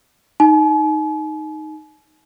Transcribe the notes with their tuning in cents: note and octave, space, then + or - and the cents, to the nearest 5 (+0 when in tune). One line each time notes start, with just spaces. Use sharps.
D#4 +0 G#5 +45